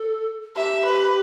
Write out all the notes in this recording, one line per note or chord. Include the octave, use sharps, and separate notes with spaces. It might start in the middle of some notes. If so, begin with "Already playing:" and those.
Already playing: A4
G4 E5
B4